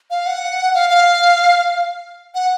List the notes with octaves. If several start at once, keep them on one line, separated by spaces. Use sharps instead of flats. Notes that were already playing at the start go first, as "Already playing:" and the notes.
F5
F#5
F5
F5
F#5